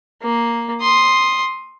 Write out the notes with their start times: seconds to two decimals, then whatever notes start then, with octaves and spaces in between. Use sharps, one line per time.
0.22 A#3
0.81 C6 D#6